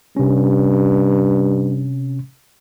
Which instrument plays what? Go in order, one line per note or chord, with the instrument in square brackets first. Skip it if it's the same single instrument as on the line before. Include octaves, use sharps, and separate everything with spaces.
[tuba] G2 [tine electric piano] C3 C#4